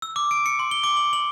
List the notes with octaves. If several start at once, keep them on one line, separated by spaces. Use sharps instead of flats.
E6
D6
D7
C#7
C6
G7
D6
F#7
F#7